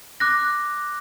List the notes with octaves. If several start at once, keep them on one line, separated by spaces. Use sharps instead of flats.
D6 F#6 A#6